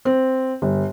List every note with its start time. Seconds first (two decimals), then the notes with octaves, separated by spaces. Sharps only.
0.05 C4
0.62 G1